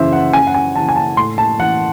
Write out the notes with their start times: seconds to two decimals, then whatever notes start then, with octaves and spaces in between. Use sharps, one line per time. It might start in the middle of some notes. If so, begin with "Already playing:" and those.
Already playing: F#2 C#3 E3 C5 E5
0.13 F#5
0.33 F#2 G#5
0.47 F#5
0.55 G#5
0.76 C#3 E3 A5
0.89 G#5
0.96 A5
1.17 A2 C6
1.38 A5
1.59 E3 F#5